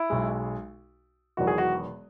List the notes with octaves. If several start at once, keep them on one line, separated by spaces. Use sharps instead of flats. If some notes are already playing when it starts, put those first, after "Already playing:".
Already playing: E4
B1 B2 G#3
E1 E2 D#3 F#3 F#4
G#4
F#4